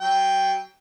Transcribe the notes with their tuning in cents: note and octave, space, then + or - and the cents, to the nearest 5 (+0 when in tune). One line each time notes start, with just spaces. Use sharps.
F#3 +25 G5 +0